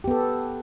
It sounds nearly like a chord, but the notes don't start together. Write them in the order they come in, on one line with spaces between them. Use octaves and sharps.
G4 B3 A4